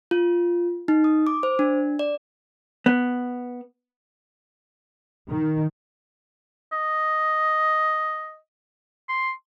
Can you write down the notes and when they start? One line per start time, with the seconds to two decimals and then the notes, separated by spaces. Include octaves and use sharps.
0.11 F4
0.88 D#4
1.04 D#6
1.27 D6
1.43 C5
1.59 D4
1.99 D5
2.86 B3
5.29 D#3
6.72 D#5
9.09 C6